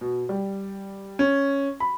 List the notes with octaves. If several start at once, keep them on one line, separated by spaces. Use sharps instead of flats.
B2
G3
C#4
B5